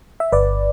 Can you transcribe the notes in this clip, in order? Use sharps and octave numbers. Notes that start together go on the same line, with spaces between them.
E5
G1 B4 D5